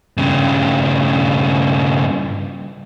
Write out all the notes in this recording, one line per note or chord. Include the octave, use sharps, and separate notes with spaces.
G2 C#3